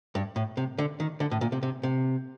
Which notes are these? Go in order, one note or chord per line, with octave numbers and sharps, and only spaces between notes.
G2
A2
C3
D3
D#3
D3
A2
A#2
C3
C3
C3